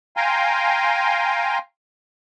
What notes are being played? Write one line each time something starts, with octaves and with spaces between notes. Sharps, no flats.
F5 G5 G#5 A#5 C6